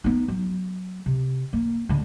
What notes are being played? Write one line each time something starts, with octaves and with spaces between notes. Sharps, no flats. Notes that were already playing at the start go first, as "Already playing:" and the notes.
B3 D#4
F#3
C3
A#3
D3 G#3